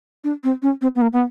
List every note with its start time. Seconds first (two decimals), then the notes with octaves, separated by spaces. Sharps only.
0.24 D4
0.44 C4
0.62 C#4
0.81 C4
0.95 B3
1.01 A#3
1.13 B3